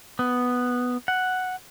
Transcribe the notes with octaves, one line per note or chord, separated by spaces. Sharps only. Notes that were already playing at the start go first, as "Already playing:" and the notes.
B3
F#5